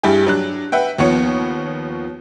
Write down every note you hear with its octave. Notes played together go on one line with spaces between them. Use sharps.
G2 G3 E4 G4 G#4
F#3 D4 F#6
B4 E5 F#5 G5
D#2 F3 B3 C#5 C#7